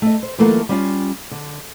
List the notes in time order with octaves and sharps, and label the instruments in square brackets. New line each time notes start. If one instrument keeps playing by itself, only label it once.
[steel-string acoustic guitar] A3 D#5
C5
E3 F#3 A3 A#3 F4 A4
G3 C#4 F4
D3